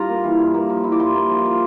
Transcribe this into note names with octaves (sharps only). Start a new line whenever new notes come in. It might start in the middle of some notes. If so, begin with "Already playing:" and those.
Already playing: G2 F4 A#5 C6
A#3
E3
G2
A#3
F3
E4
D6
G2 C6
A#3
F3
F4